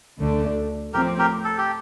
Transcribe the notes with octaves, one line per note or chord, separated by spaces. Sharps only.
D2 D3 A3 D4
A2 F3 C4 G4 A#4
G4 A#4
A4
G4